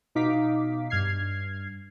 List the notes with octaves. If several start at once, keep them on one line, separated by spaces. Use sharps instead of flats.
B2 D#4 F5 D6 B6
G2 F6 G#6 C7